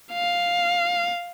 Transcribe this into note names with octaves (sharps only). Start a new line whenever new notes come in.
F5